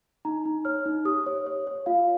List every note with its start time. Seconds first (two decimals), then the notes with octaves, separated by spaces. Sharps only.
0.25 D#4 A#5
0.45 D#4
0.65 C#5 F6
0.86 D#4
1.05 G4 D#6
1.26 C#5
1.46 C#5
1.67 C#5
1.86 F4 F5